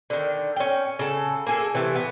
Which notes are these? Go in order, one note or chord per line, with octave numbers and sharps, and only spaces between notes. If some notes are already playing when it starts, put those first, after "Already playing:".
D3 D#3
C#4 G5
C#3 A4
A#3 G#4 A4
C3 E3 A3
B3